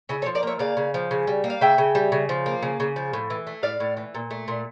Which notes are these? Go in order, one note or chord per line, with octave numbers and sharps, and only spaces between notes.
C#3 C#4 E4
A4 C#5
F3
A#4 D5
A#3 C#5 E5
C#3 D5 F5
C#3
F3
C#3
G3
A#3
F5
C#3 E5 G5
C#3
G3
C#3
F3
A#3
C#3
C#3
F3
A2
E3
A3
A2 D5 F5
A2
E3
A#2
A3
A#2